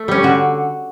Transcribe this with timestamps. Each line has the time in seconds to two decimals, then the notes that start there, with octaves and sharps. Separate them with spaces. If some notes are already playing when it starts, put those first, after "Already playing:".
Already playing: A3
0.08 G3 C#4
0.23 D3 F#4